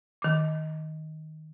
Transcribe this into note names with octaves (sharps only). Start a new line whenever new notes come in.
D#3 D6